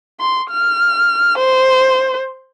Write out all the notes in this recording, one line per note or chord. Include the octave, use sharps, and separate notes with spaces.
C6
F6
C5